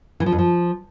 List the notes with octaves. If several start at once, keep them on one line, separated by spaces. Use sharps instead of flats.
E3
F3
F2
F3